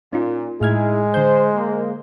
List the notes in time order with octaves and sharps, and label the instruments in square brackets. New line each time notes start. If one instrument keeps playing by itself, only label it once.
[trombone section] A#2 [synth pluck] C#4 D#4 F4
[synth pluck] A2 F6 G#6 [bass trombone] G#3 [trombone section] D#4 E4 G#4
[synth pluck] D3 G6 [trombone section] C5
[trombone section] A#3